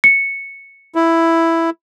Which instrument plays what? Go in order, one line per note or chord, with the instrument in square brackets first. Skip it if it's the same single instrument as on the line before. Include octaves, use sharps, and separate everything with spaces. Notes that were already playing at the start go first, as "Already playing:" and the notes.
[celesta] C#7
[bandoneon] E4